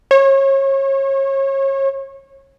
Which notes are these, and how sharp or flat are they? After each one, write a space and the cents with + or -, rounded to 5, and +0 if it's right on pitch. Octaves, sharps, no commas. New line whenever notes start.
C#5 -30